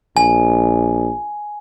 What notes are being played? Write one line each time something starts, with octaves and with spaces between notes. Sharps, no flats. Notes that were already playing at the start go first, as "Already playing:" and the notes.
A#1 G#5